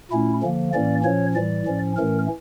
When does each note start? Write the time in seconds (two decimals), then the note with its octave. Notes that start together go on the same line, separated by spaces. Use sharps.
0.11 A#2 A3 C#4 E4
0.42 D3 F3 A#3
0.73 A2 E3 A#3 C#4 D5
1.04 A#2 F3 C#4 C#5
1.35 A2 E3 G3 D5
1.66 A2 F3 C#4
1.97 A2 E3 A3 C#4 A#4